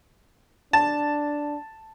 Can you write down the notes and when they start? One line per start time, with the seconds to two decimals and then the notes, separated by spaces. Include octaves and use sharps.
0.73 D4 A5